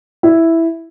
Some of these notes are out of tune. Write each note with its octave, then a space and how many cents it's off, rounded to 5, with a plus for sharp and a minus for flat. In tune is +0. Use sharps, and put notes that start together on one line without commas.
E4 +0